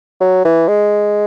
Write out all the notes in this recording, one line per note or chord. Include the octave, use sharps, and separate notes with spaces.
F#3
E3
G#3